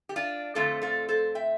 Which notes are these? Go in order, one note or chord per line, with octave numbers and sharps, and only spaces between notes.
G4
D4 F4
F2 D3 A3 C4 F4 A4
F4 A4
A4 C5
E5 G5